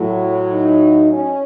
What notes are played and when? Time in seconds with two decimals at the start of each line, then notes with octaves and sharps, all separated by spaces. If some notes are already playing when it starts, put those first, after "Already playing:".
Already playing: A2 F#3
0.51 D#4
1.11 C#4